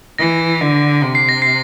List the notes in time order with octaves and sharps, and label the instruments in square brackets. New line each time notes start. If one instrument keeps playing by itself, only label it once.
[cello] E3 [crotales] A#6
[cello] D3
C3
[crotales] C7
A#6
C7